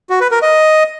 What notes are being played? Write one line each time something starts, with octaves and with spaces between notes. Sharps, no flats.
F#4
B4
A#4
D#5